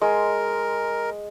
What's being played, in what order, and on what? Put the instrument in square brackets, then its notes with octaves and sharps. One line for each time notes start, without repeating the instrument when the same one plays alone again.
[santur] G#3 [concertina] A#4